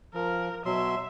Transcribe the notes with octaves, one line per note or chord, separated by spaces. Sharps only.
F3 A#4
B2 F#3 E5 C6